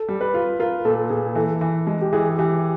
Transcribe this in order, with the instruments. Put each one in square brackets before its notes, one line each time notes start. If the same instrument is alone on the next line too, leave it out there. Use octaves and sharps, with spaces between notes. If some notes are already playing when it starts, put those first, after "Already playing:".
Already playing: [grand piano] A4
[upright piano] G3
[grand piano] B4
[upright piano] F4
[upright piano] F4 [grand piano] A#4
[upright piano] A#2 [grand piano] A4
[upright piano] A#2 [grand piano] G#4
[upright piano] E3 [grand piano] A4
[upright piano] E3
G#3
[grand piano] G4
[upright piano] E3 [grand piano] G#4
[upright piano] E3 [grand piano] G4